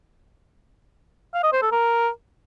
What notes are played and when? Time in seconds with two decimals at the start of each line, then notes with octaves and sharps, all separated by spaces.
1.34 F5
1.43 D#5
1.53 C5
1.62 A4
1.72 A#4